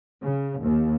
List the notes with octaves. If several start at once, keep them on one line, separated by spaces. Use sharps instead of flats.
C#3
D#2